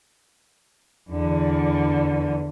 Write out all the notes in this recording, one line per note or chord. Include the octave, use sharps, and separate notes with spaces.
E2 D3